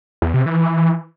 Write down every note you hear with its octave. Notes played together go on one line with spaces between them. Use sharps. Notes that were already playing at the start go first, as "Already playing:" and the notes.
E2
C3
E3